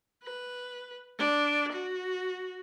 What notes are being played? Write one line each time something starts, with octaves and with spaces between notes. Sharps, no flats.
B4
D4
F#4